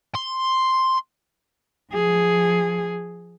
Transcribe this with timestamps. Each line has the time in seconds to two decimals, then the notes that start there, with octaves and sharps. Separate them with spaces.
0.15 C6
1.92 F3 G#4